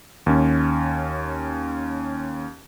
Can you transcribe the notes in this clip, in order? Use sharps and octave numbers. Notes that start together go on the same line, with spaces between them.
D#2 C#4